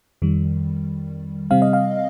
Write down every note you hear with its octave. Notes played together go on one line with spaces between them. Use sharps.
F2 D#3 G3
C3 G3 C4 F5
D#5
F5